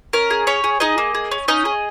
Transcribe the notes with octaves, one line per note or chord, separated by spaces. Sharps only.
C#4 A#4
G#4
C#4 C#5
G#4
D#4 G#4 D#5
A#3
G#4
C#4
C#4 D#4 D#5
G#4